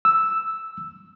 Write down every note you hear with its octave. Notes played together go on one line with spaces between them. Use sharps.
E6